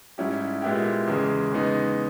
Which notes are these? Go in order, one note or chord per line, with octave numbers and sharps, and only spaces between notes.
G#2 G3 C#4 E4 G4
A#2 G#3 B3 E4 G4
E2 C#3 G#3
E2 C#3 G#3 B3 D#4